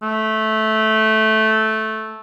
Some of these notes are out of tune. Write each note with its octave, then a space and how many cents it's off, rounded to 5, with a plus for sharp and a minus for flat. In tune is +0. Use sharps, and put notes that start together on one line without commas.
A3 -10